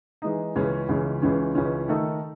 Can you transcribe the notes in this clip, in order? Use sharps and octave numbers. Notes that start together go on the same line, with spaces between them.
E3 G#3 D#4
C#2 C#3 E3 G#3 C#4
C#2 C#3 E3 G#3 C#4
C#2 C#3 E3 G#3 C#4
C#2 C#3 E3 G#3 C#4
D#3 A3 D#4 A4 D#5